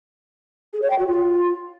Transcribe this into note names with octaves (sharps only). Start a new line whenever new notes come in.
G#4
C#5
G5
F#4
F4